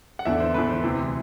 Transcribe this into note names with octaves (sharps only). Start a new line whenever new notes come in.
F#5
E2 D3 E5
C5
E2 D3 B4
C5
D2 C3 E3